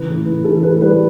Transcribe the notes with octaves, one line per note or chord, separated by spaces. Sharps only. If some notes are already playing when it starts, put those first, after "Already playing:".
Already playing: C#3 E3 B4
A2
A2
E3 A4
A2 B4
G3 B4